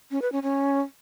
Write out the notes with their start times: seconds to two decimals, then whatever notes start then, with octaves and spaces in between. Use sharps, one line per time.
0.11 C#4
0.22 B4
0.32 C#4
0.43 C#4